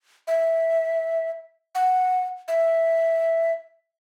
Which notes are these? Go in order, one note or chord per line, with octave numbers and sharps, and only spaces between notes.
E5
F#5
E5